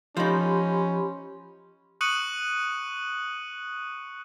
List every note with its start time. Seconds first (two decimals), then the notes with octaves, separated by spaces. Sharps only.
0.17 F3 C#4 D#4 G4 B5 C6
2.01 C#6 D#6 F#6 C#7 D#7 F#7